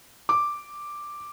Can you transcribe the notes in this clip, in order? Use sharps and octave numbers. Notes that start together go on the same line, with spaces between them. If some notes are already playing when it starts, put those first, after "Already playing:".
D6